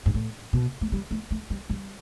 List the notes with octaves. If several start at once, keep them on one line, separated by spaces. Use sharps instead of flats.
G2
A2
B2
A3
G3
A3
A3
G3
G3